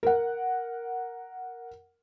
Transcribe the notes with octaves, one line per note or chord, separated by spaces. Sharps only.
A#4 F#5